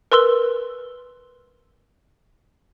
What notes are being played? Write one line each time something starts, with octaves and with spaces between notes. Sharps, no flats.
A#4 B4 C6 E6 G7